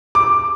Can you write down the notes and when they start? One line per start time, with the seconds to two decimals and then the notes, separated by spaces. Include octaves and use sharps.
0.15 D6